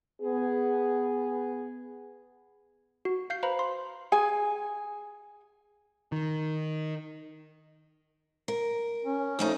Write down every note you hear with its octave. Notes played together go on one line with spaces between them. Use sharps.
B3 G#4
F#4
F5 G6 C7
B4 C5 F5 A#5 B5
C6
G#4 G#5
D#3
A#4
C#4
F2 A3 D#4